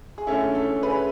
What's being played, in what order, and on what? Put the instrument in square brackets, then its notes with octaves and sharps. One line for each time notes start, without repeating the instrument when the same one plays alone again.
[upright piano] G#4
[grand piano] D3 A3 C#4 E4 [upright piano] A4
[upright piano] A4
G#4 B4